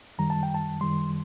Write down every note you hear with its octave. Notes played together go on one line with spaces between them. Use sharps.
F#2 D#3 G3 A#5
A5
G5
A5
F#2 D#3 G3 C6